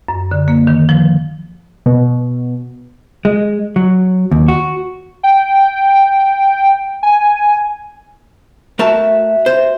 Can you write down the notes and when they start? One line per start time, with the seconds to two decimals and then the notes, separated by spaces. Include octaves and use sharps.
0.08 F#2
0.31 D3
0.48 A#3
0.67 D#3
0.89 F3
1.86 B2
3.25 G#3
3.76 F#3
4.31 D#2
4.48 F#4
5.23 G5
7.03 G#5
8.79 A3 F#4 A#4 E5 A5
9.46 C5